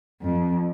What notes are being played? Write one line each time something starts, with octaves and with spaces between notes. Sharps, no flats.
F2